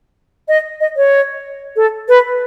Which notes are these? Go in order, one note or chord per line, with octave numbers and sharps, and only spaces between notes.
D#5
D#5
C#5
A4
B4